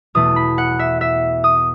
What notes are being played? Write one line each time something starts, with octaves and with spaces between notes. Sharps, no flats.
E2 B2 A3 D#6
B5
F#5
E5
E5
D#6